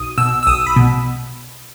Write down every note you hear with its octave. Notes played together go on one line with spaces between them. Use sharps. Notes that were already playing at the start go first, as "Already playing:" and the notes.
Already playing: B1 D#6
B2 E6
E6
B1 D#6
B5
B2